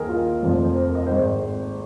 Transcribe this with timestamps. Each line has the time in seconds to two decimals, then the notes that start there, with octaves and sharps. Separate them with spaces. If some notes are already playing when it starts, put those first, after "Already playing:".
Already playing: D#2 D#3 G#4 A#4
0.09 F4
0.42 F1 F2 F3
0.65 C5
0.74 A#4
0.95 D#5
1.06 G#1 G#2 D#3 C5